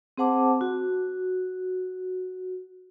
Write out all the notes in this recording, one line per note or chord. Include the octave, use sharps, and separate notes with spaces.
C4 G#4 C5 F#5 A5 D6
F#4